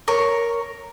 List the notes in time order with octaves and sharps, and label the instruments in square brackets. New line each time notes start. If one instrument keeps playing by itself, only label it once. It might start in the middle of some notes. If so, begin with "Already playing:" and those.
[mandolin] A#4 C#5